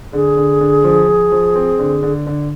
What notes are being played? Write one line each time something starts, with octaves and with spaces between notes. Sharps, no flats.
D3 G#4
D3
D3
F3
F3
F3
C4
D3
D3
D3